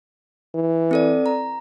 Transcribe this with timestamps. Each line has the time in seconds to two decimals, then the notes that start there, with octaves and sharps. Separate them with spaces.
0.55 E3
0.91 C4 A4 D5
1.26 A#5